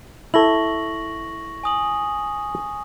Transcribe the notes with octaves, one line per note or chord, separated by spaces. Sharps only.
E4 A4 C#6 A#6 F#7
G#5 D#6 F#7